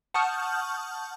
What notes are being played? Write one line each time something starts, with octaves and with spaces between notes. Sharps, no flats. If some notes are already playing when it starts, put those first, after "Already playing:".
F#5 A5 C#6 D#6 F6 G6